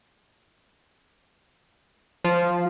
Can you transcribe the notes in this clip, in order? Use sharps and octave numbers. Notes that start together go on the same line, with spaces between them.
F3